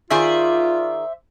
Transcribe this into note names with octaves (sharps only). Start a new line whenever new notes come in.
D#3 F4 G#4 C5 D5 E5